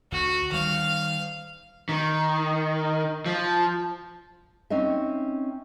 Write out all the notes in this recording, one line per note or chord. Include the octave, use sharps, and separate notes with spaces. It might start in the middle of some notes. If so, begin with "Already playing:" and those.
D2 F#4
D#3 G3 F5
D#3
F3
C4 C#4 D#4 E5